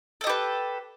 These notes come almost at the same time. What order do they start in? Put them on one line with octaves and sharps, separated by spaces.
A4 D#5 G4 B4